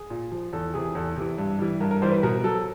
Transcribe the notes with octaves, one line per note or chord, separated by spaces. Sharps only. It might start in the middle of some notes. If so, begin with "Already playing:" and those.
Already playing: G#4
A#2
F3
E2 A4
C3 E3 G#4
E2 A4
C3 E3
G2
E3 G3
G2 A#4
A#4
E3 G3 C5
B4
B2 A#4
F#3 A4